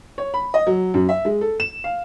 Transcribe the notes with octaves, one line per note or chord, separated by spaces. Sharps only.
C#5
B5
D#5
F#3
F#2
E5
G#3
A4
E7
F5